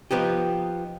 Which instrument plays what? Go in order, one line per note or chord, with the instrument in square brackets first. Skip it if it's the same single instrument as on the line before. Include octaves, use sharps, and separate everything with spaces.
[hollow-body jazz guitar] F3 B3 D#4 G4